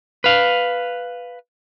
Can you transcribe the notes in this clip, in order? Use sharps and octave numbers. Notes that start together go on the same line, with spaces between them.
B4 F5